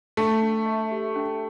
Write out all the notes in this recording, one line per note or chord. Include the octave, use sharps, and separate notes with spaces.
A3 D4
D4
E5
G4
D4